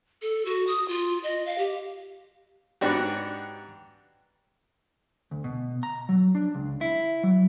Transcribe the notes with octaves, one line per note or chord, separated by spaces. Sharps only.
A4
F#4
D#6
F4
D#5
F5
G4
G#2 B3 D4 F#4 G4
D2
B2
A#5
F#3
D4
C#2
E4
F#3